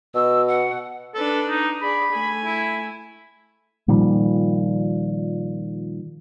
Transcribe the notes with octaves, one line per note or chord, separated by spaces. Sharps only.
B2 E6
F#5
D4 A4 B4
D#4
G#4 D5 B5
A3 G#5
E4
A#2 D#3 F3 G3